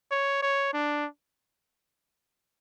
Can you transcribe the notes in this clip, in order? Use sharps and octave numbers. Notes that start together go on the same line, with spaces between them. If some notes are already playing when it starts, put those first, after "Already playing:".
C#5
C#5
D4